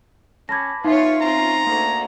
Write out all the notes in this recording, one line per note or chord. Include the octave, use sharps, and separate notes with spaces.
C#4 A5 B5 D6 G#6 A#6
B3 D#4 F4 B4 C#5 E5 F5
C4 C#4 F4 A#5
D2 A#3